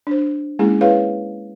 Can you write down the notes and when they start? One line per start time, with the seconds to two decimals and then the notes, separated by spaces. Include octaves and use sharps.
0.07 D4 C5
0.59 G#3 A#3 C#4 E4 G#4
0.81 E4 G#4 B4 C#5 F5